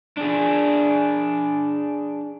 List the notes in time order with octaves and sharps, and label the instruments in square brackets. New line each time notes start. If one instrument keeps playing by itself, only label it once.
[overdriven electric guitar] D4 G#4